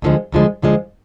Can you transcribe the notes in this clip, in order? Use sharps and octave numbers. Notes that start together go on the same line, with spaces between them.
D2 D3 F3 G#3
D2 D3 F3 G#3
D2 D3 F3 G#3